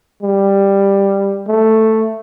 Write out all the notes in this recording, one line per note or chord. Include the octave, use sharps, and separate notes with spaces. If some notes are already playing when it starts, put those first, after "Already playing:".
G3
A3